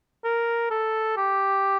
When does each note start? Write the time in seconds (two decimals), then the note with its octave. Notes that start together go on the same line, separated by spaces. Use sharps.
0.24 A#4
0.71 A4
1.17 G4